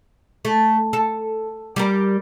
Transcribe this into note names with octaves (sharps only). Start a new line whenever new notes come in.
A3
A4
G3 G4 A#4